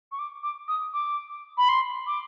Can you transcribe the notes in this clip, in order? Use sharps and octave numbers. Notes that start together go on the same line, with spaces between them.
C#6
D6
D6
D#6
D6
B5
C6
D6